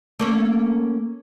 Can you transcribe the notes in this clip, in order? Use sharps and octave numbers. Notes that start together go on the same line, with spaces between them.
A3 A#3 C#4